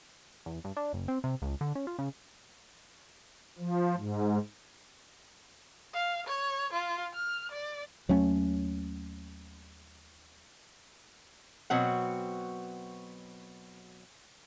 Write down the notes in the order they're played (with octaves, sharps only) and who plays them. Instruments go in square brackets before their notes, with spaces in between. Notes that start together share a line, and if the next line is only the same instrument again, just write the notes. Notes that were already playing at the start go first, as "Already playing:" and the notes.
[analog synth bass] E2
G2
D4
F#1
C4
C3
C#2
D3
C#4
F4
C#3
[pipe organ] F3
G#2
[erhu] F5
C#5
F4
F6
D5
[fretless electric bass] D#2 F#3 A3 C#4
[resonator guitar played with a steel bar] B2 F#3 C4 F#5